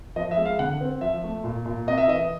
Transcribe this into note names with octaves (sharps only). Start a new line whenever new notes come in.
F3 D#5
E5
G#3
F5
D3 F#5
C4
F3 E5
A3
A#2
A#2
C3 D#5
E5
E3 D#5